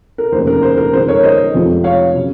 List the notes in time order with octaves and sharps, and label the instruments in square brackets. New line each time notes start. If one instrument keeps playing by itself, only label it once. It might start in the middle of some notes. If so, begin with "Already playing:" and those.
[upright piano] A#4
F1 D#2 C#3 C5
A#4
C5
A#4
F2 D#3 G#3 C5
A#4 C#5
C5 D#5
F1 F2 C3 F3 G#3
C#5 F5
C#3 F#3